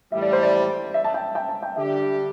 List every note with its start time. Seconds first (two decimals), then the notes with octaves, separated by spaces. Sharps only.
0.12 A2 E3 G3 E5
0.22 D5
0.33 C5
0.43 D5
0.94 E5
1.04 A5
1.14 G5
1.35 G5
1.49 A5
1.63 G5
1.76 D3 G3 D4 G4 E5